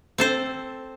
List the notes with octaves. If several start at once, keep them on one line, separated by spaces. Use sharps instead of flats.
C4 A4 C5